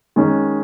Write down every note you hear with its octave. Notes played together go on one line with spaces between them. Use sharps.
D#3 G#3 C#4